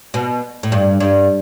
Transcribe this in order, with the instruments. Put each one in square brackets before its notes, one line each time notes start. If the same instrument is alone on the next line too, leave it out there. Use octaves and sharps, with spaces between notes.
[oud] B2
A2
G2
G2